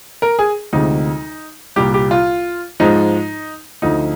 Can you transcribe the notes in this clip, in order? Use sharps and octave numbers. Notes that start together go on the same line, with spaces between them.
A#4
G#4
D2 C3 F3 G#3 D#4
C2 A#2 G3 G4
G4
F4
G#2 F3 G#3 D#4
D2 D3 F3 D#4